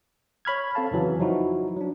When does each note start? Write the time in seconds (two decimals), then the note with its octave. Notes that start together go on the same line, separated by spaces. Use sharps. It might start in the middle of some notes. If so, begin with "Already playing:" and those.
0.45 C#5 B5 F6 G#6
0.75 C4 A4 F5 A5
0.91 F2 C#3 E3 F#3
1.20 F3 F#3 D#4 E4 F#4
1.77 F#3 D4